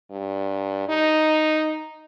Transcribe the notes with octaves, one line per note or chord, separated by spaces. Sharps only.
G2
D#4